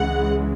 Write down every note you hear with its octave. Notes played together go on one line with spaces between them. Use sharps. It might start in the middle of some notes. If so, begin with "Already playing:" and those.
Already playing: C#2 C#3 E3 G#3 F#5